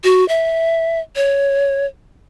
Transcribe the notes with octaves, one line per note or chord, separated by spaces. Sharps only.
F#4
E5
C#5